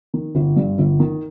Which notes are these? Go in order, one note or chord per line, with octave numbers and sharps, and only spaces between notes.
D#3
G1
G2
G1
D#3